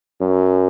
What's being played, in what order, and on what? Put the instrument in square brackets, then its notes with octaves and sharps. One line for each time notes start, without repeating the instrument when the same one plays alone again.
[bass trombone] F#2